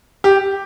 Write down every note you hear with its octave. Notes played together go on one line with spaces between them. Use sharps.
G4